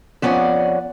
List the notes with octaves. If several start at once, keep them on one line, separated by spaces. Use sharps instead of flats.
F2 B3 C#4 D5 F#5